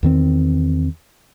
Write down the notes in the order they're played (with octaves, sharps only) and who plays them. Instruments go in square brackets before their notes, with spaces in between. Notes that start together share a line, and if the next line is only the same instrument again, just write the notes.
[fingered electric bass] E2 D#3 C4